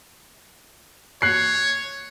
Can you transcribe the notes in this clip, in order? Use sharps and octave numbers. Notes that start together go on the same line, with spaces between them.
C#5 F#6 C7